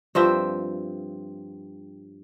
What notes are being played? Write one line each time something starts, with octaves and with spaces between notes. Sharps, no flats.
G2 F3 C4 E5